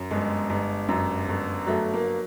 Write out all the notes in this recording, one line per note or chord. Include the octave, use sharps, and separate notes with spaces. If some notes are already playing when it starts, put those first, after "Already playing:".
Already playing: F#2
G1 G#3
G1
F#2
G1
F#3 A3
A#3